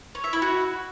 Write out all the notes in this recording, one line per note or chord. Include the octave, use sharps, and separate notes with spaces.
C#5
E5
E4
F#4